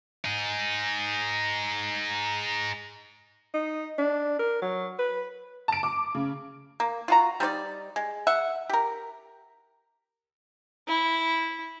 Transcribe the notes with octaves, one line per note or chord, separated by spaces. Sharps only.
D#4 G#4
D#4
D4
A#4
F#3
B4
A5 D7
D6
C#3
A#3
F4 F#4 A#5
G3 D#4 C5 D5
G#3
E5 F#5
G4 A#4
E4